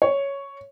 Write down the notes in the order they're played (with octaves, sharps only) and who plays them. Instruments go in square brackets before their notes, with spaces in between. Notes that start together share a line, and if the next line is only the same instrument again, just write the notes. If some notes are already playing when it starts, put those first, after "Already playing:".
[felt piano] C#5